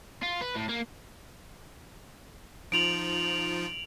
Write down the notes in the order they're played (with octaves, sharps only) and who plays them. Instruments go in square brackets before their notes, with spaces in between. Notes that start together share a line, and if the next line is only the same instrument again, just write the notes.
[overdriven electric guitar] F4
B4
A2
A#3
[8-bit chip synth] F3 D#4 F4 [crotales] D7 F7 F#7